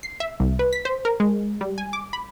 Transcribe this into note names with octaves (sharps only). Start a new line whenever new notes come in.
C7
E5
C2
B4
B6
C5
A#4
G#3
G3
G#5
D6
B5